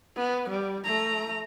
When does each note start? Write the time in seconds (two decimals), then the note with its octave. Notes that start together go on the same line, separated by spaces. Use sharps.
0.16 B3
0.50 G3
0.84 A3 A#5